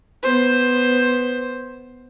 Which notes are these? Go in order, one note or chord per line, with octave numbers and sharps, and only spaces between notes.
B3 C5